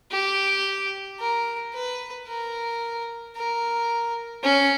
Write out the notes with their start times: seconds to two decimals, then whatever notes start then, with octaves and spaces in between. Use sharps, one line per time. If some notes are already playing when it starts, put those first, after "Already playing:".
0.11 G4
1.20 A#4
1.74 B4
2.27 A#4
3.36 A#4
4.44 C#4